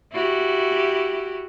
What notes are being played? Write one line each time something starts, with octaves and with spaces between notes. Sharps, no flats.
E4 F#4 G4